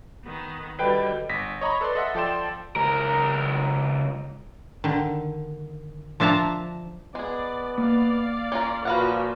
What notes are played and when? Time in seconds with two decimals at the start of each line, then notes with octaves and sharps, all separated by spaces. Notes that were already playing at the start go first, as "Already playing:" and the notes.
0.24 D#3 B3
0.79 D3 G3 F#4 B4 D#5 G5
1.29 G1 A#6 B6
1.61 C#5 D#5 A#5 B5 C#6
1.81 A4 B4 D5 C6
1.95 A4 D#5 E5 F#5
2.15 F3 A4 D5 G5 C6 E7
2.76 C#2 A#4
4.84 D3 D#3
6.20 F3 D4 E5 A5 A#5
7.15 G#3 B3 G#4 D5
7.78 A#3 D5 F5
8.52 C#4 F4 A#4
8.85 A#2 F3 F#4 B4 F5 F#5